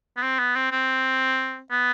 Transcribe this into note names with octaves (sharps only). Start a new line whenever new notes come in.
B3
C4
B3
C4
C4
B3